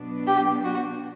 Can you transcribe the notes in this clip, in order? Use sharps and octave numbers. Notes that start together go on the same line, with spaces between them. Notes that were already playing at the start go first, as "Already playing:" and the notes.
Already playing: B2 F#3 B3 D4
G4
F#4